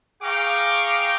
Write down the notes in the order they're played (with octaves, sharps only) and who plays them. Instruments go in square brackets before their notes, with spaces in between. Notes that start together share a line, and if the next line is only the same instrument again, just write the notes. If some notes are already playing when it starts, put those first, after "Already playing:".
[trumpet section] G#4 F5 G5 A#5 C#6 D6